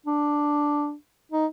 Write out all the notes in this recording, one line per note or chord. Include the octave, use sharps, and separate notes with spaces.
D4
D#4